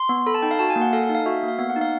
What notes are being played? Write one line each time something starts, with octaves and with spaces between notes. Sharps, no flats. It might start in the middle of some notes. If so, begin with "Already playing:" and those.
Already playing: C6
B3
A4 B5
A5
D#4 G5
F5
F#4 A5
G#5
A#3
F#5
A4 F5
F5
D#4
F5
F#4 E5
A#3
F5
B3 F5
F#5
D#4
F5